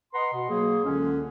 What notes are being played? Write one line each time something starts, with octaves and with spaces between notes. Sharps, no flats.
B4 D#5 F#5 A#5 C6
B2
F#3 A#3 G#4
C#2 D3 G#3 C#4